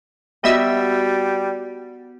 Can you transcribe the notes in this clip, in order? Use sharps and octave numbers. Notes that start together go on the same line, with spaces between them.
G3 B3 F#4 D#5 E5 E6